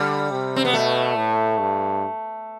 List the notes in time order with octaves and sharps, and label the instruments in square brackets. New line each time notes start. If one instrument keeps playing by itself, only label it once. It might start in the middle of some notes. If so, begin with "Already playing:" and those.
Already playing: [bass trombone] D3 [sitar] G3
[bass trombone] C3
[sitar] C4
B3
[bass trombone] B2 [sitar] A3
[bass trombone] A2
G2